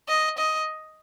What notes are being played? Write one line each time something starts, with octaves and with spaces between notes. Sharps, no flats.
D#5
D#5